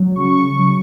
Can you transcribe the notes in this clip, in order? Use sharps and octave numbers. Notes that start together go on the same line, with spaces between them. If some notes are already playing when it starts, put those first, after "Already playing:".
Already playing: F#3
C#3 C#6
F#3